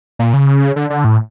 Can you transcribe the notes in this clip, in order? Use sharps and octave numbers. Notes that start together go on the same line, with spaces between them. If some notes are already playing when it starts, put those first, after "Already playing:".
A#2
C#3
D3
D3
A2